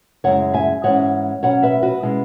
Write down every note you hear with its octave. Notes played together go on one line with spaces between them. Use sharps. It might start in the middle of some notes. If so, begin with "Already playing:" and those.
F#2 C#3 G#3 E4 C#5 F#5
E5 G#5
G#2 E3 G#3 C#4 E4 C#5 F#5
B2 F#3 C#4 C#5 F#5
B4 E5
F#4 B4
B2 G#3 C#4 E4